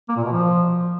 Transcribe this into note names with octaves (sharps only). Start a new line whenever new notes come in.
A#3
A#2
B2
F3